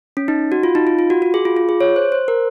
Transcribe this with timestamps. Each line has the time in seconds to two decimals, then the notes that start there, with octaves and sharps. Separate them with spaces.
0.17 C#4
0.28 D#4
0.52 F#4
0.63 F4
0.75 D#4
0.87 F4
0.99 F4
1.10 F#4
1.22 F#4
1.34 G#4
1.45 F4
1.57 F4
1.69 G#4
1.81 C#5
1.96 C5
2.12 C5
2.28 A#4